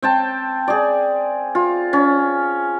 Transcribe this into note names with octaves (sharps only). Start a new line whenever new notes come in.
C4 G5 A5
G#4 D5
F4
C#4